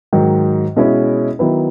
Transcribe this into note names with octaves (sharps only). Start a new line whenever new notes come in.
G#2 D#3 F#3
B2 G#3 C#4 E4
D#3 F#3 B3 E4 B4